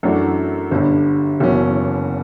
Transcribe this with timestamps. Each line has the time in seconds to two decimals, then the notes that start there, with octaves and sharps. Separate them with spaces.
0.03 F#2 E3 A3 D4 F#4
0.71 G1 G2 D3
1.40 F#1 E2 B2 F#3 C#4